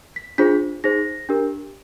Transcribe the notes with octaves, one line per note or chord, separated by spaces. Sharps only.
B6
D4 F4 G#4 C5 B6
D#4 G#4 C5 A#6
D4 G4 A#4